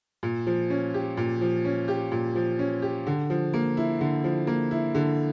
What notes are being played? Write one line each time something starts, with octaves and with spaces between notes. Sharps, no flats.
A#2
F3
C#4
G4
A#2
F3
C#4
G4
A#2
F3
C#4
G4
D3
F3
A#3
E4
D3
F3
A#3
E4
D3